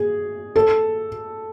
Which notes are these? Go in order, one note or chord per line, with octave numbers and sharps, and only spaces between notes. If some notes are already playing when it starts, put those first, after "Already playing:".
Already playing: G#4
A4